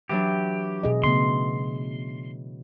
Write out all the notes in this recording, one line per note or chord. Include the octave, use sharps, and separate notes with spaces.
E3 F#3 D4 G4
B2 G#4 D#5
C#3 A3 B3 C6